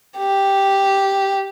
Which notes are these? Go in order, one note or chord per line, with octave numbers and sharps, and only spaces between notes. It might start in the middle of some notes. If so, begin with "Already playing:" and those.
G4